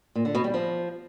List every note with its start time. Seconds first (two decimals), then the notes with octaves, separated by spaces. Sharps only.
0.15 A#2
0.25 D3
0.35 B2
0.44 G3
0.54 F3